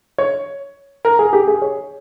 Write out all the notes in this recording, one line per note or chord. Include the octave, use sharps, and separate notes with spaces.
C#5
A#4
G#4
G4
G#4
C#5